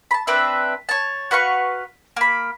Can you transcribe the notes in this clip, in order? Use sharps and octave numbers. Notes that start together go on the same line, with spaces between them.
A5 B5
C4 D4 B4 E5
C#5 A5
F#4 B4 F5 C#6
A#3 B5